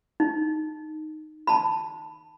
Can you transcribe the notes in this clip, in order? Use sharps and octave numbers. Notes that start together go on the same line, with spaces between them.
D#4
A5 B5